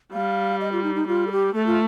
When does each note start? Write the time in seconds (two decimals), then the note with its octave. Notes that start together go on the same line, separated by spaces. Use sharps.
0.13 G3 F5
0.60 D#5
0.72 F4
0.83 D#4
0.95 D#4
1.07 G3 F4
1.27 A4
1.32 G4
1.54 A3 A4
1.67 F4